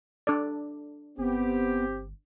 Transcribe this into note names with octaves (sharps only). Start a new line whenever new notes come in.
D4 A4 D5
G1 B3 C4 G4